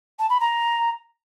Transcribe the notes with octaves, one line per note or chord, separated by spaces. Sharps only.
A5
B5
A#5